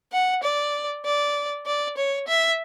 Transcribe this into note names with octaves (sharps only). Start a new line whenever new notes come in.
F#5
D5
D5
D5
C#5
E5